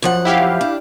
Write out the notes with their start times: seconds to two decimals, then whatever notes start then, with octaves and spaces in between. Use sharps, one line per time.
0.02 F#2 F3 F#5
0.25 E4 G4 F5
0.61 D4